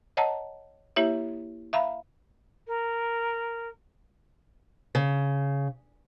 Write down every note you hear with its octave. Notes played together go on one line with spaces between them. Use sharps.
C#5 D#5 F#5 A5 A#5
A#3 E4 G4 C#5 E5
E5 F5 A#5 B5
A#4
C#3